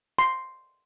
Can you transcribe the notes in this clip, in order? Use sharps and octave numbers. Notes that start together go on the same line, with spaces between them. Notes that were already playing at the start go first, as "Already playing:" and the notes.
C6